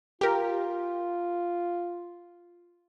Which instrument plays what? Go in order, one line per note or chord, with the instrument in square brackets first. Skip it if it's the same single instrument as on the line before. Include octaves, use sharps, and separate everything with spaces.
[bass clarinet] F4 [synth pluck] G4 A#4